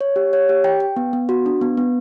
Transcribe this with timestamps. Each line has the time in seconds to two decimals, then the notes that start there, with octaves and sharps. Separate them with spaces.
0.01 C#5
0.16 G4
0.33 C#5
0.49 G4
0.64 G5
0.80 G5
0.96 B3
1.13 B3
1.29 F#4
1.46 D4
1.61 B3
1.77 B3